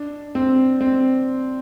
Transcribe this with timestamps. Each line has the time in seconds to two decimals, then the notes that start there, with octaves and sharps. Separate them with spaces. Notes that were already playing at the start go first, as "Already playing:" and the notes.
Already playing: D4
0.35 C4
0.81 C4